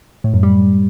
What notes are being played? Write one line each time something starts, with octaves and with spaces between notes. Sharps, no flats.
A2
F#2
G3